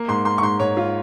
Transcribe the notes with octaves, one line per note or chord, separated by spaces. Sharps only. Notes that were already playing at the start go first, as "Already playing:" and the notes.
Already playing: A#3
G#2 C6
A#3 C6
C#6
G#2 C6
G#2 C#5
F4